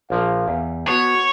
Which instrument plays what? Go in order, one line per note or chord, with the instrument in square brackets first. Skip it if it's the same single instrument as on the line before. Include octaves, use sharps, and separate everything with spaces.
[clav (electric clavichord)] A#1 F3 A#3 [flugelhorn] F5
[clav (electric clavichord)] E2
[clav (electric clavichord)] B3 A5 [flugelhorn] F#4 [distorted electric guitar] C#5